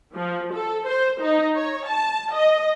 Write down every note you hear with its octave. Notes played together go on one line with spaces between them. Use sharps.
F3
A4
C5
D#4
C#5
A5
D#5